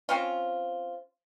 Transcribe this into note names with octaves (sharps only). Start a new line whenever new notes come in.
C4 C#4 F4